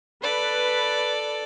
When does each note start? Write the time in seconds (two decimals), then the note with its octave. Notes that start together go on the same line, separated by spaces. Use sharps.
0.23 A4 B4 D5